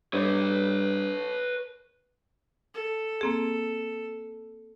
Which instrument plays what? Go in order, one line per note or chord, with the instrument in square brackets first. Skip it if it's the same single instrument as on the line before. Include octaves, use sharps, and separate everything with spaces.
[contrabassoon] G2 [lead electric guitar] B4 C#5
[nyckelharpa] A4
[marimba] A#3 C4 G#4